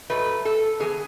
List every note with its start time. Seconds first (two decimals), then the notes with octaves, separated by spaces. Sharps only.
0.10 G#2 F#3 A3 B4
0.45 A4
0.80 E3 B3 G#4